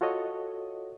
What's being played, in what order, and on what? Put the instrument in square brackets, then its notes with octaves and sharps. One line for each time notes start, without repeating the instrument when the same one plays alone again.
[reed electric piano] F4 F#4 A4 C#5 D#5